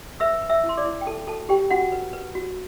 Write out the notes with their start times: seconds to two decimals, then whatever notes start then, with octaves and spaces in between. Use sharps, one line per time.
0.20 B4 E5 E6
0.42 B4
0.49 E5 E6
0.63 E4
0.69 C6
0.77 D5 D6
0.84 E4
1.01 G5
1.07 A4 C5 A5
1.27 F#4 A4 A5
1.49 G4 C5 G5
1.70 F#4 F#5
1.92 B4
2.13 B4
2.35 F#4